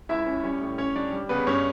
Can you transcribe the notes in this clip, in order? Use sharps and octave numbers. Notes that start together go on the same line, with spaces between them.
C#2 E4 E5
C#4
G3 C#4 C#5
A2
C#4 C#5
G3 D4 D5
G3
C#3 B3 B4
G2 C#4 C#5